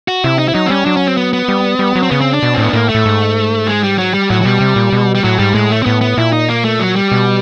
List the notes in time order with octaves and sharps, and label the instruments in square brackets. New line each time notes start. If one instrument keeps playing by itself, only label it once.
[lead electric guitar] F#4
[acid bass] C3 [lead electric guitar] E4
[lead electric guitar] D#4
E4
[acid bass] F#3 [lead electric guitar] D#4
[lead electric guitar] C4
[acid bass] G3 [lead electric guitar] C#4
[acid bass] F#3 [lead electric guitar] D4
[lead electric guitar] C#4
C4
B3
B3
[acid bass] G3
G3
F#3
[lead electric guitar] C4
[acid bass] C#3 [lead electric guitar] B3
[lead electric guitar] C4
D4
[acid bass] B2
[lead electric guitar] C4
[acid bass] A2
[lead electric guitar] B3
[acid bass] A2 [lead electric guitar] A#3
[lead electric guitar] A3
[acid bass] A2
G#2
[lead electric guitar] G#3
G3
F#3
G3
[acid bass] A2 [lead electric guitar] F#3
[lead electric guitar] F#3
[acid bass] B2 [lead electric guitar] G3
[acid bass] C3
A#2
B2
[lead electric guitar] G3
[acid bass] A2 [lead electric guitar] F#3
[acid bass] G#2 [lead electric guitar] G3
[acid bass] A2 [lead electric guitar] G#3
[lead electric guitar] A3
C4
[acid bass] A2 [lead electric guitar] B3
[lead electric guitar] B3
[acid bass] A#2 [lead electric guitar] E4
[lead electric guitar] D#4
A#3
A3
F#3
G3
[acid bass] B2